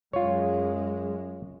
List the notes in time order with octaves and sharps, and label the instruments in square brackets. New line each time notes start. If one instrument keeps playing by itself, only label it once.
[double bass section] F#2 G#3 [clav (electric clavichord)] F4 C#5